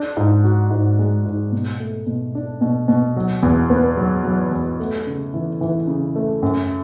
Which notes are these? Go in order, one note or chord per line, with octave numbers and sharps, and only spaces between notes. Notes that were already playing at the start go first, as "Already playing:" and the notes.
Already playing: D4
G#2
F#4
G#2
G#3
G#2
B2
A3
B2
D4
B2
B2
F#3
E2
B3
F#3
F#3
E2
A3
C#3
E3
E3
C#3
A3
F#2